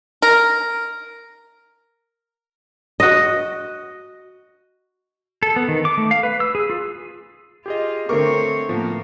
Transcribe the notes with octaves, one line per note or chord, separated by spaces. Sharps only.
A#4
F#4 D#5
A4
B3
D#3
D6
A3
F5
B4
E6
G#4
F4
F4 G4 G#4 D#5
D3 A3 C4 A#4 C#5 C#6 D6
A2 F3 A#3 B3